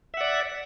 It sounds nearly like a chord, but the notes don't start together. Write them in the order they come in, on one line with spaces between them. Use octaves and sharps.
E5 F#5 D5